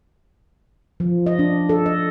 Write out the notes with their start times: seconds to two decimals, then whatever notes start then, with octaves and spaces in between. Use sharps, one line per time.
1.00 F3
1.26 D#5
1.39 D4
1.69 A4
1.86 D#5